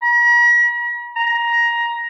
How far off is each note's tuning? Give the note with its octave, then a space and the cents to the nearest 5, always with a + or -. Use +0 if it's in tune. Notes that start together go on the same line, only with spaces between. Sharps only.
A#5 +45
A#5 +15